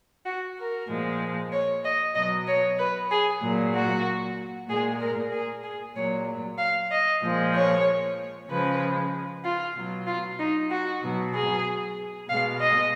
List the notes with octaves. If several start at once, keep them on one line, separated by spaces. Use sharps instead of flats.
F#4
A#4
A#2 F3 G#3
C#5
D#5
B2 F#3 D#5
C#5
B4
G#4
A#2 F#3
F#4
A#2 G#3 G#4
A#4
G#4
G#4
A#2 F#3 C#5
F5
D#5
A#2 F3 G#3
C#5
C#3 F3 G#3 B4
F4
B2 F#3
F4
D#4
F#4
B2 F#3
G#4
B2 G#3 F5
D#5